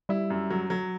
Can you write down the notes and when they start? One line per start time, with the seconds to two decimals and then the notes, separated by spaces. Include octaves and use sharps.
0.09 G3 E4
0.30 F#2
0.50 F#3
0.70 F#3